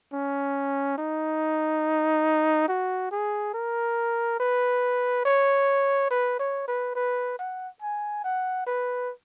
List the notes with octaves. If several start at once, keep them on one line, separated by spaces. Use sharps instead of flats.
C#4
D#4
F#4
G#4
A#4
B4
C#5
B4
C#5
B4
B4
F#5
G#5
F#5
B4